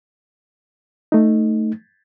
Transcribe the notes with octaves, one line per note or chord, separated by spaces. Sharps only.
A3 D#4